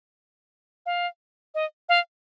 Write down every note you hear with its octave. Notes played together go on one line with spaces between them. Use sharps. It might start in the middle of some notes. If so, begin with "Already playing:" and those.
F5
D#5
F5